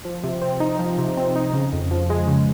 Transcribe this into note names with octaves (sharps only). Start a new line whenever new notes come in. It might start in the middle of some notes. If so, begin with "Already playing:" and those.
F3
C3
C4
D#4
F3
C3
C4
D#4
C#3
F2
F3
G#3
C#3